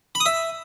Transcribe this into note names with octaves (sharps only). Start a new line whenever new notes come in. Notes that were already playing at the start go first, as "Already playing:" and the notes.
B5
D#6
E5